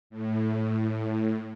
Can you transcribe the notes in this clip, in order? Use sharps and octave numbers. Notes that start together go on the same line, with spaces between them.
A2